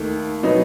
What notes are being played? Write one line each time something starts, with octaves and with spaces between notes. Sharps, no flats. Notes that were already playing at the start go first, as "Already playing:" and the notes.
Already playing: D#2 D#3 A3
B2 F#3 B3 D#4